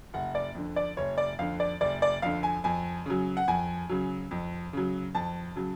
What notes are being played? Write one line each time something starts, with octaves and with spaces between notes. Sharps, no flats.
F#1 F#5
D5
F2 D3
D5
F#1 C#5
D5
F2 D3 F5
D5
F#1 D5
D5
F2 D3 F5
G#5
F2 G#5
C#3 F#3
F#5
F2 G#5
C#3 F#3
F2
C#3 F#3
F2 A5
C#3 F#3